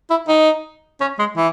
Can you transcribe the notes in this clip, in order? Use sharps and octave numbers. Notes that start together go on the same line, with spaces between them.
E4
D#4
C#4
G#3
E3